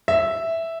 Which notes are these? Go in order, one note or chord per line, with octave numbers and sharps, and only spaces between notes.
E5